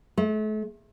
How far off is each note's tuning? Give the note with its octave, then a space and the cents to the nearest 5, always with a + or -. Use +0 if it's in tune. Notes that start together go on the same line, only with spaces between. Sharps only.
A3 -40